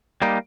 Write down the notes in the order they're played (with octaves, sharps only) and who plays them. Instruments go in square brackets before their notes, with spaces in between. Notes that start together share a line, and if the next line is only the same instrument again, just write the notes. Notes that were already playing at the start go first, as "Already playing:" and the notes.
[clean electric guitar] G3 A#3 D#4